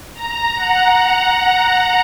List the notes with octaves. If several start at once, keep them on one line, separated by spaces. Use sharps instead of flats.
A#5
F#5